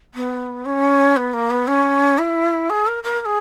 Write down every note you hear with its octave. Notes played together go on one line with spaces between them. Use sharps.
B3
C#4
B3
A#3
B3
C#4
E4
G#4
A#4
A#4
A#4
G#4